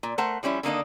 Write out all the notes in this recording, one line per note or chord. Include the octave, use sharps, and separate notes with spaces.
A#2
A3 A#4 C5 F#5
F3 G3 C#4 E4
D3 D#3 A#3 D4 D#4